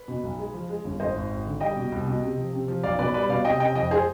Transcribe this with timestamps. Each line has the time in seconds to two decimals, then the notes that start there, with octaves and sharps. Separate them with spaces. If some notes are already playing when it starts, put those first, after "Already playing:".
Already playing: B4
0.08 B2
0.23 B1
0.38 G#3
0.54 F3
0.69 G#3
0.84 G1
1.00 G#1 C5 D#5
1.15 G#1
1.30 G#1
1.46 D3
1.61 G3 D#5 G5
1.76 B2
1.92 C2
2.07 B2
2.22 C3
2.38 F3
2.53 C3
2.68 F3
2.83 B1 D5 F5
2.99 B2 B4 D5
3.14 G3 B4 D5
3.29 B2 D5 F5
3.45 C3 D#5 G5
3.60 C3 D#5 G5
3.75 F2 D#5 G5
3.91 G#3 G#4 C5